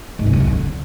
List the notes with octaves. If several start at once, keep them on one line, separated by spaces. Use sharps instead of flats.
G#2
C#3
F2
F#2
D3